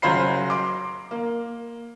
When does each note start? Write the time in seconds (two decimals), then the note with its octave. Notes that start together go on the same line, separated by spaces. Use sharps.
0.02 F#1 F#3 F4 C5 B5 C7
0.50 C6 D6
1.11 A#3